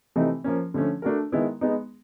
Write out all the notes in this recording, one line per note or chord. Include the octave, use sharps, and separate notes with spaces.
C3 E3 A3 C4 D#4
F3 A#3 C#4
D3 F3 A3 C#4
A3 D4 F#4 A#4
D#3 G#3 B3 E4
G#3 B3 D#4